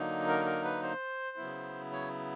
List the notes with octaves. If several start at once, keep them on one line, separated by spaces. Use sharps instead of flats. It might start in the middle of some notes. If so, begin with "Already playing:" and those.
Already playing: D3 F#3 A#3 D#4
A#4
A#4
B4
C5
C#3 F#3 B3 E4
C#5